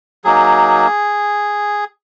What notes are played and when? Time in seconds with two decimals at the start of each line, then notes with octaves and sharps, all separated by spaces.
0.24 F#3 A#3 D#4 G#4